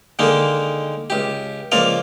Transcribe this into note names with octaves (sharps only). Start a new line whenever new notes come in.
D3 D#3 G#3 A#3 D#4
C#2 G4
C#2 F3 A#3 D5 A#5